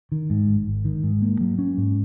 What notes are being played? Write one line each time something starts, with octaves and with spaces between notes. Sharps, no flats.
D#3
G#2
G#1
G#1
D#3
G#2
A#3
F#3
C#4
G#2